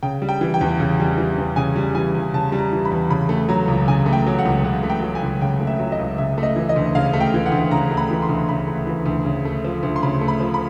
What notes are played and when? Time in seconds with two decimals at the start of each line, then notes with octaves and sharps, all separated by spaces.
0.03 C#3 G5
0.22 G3
0.29 G5
0.41 E3
0.54 G5
0.61 E2
0.80 C#3
1.00 G3
1.18 E3
1.38 E2
1.56 C#3 G#5
1.76 G3
1.95 E3 G#5
2.15 E2
2.34 C#3 A5
2.52 G3
2.59 A#5
2.73 E3
2.85 B5
2.91 E2
3.10 C#3 B5
3.29 A3
3.49 F#3 A#5
3.68 C#2
3.88 C#3 G#5
4.06 A3
4.13 G5
4.26 F#3
4.39 F#5
4.45 C#2
4.64 C#3 F#5
4.83 A3
4.90 G5
5.02 F#3
5.15 G#5
5.22 C#2
5.41 C#3 G5
5.60 A3
5.67 E5
5.79 F#3
5.92 D#5
5.99 C#2
6.18 C#3 E5
6.38 A3
6.43 D#5
6.56 E3
6.69 D#5
6.76 D2
6.95 C#3 F5
7.13 A3
7.20 G5
7.34 E3
7.46 F#5
7.52 D2
7.71 C#3 A#5
7.91 A3
7.97 B5
8.11 E3
8.22 C6
8.29 D2
8.49 C#3 B5
8.67 A3
8.87 E3
9.06 D2
9.25 C#3
9.45 A3
9.64 F3
9.83 D2
9.96 C6
10.03 C#3 B5
10.21 A3
10.28 B5
10.40 F3
10.54 B5